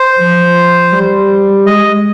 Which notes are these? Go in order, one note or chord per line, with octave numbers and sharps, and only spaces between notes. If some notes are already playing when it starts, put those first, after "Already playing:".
Already playing: C5
F3
G3
G#3 D#5